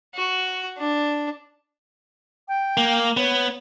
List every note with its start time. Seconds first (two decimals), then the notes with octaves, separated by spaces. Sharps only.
0.15 F#4
0.78 D4
2.48 G5
2.77 A#3
3.17 B3 C#5